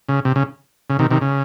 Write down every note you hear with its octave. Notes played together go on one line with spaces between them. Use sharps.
C#3
C3
C#3
C#3
C3 D#3
C3 D#3
C#3